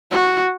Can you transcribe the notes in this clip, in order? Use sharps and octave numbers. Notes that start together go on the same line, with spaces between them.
F#4